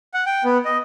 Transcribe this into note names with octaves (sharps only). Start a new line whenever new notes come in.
F#5
G5
B3
D#5